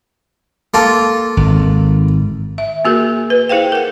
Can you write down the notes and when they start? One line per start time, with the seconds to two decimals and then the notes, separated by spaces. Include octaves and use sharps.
0.74 A#3 F4 A4
1.37 G#1
2.58 E5
2.85 A#3 F#4 G#4 A#4
3.30 B4
3.49 E4 G#4 C5 F5 G5
3.72 A#4 F#5